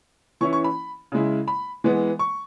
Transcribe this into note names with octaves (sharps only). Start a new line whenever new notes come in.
E3 C#4 E4 C#6
C#6
B5
C#3 G#3 E4
B5
E3 G#3 B3
C#6